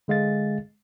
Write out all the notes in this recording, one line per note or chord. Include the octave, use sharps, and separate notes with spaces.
D3 G#3 F5 A6